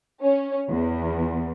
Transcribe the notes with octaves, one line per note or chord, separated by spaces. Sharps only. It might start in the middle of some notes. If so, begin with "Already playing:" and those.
C#4
E2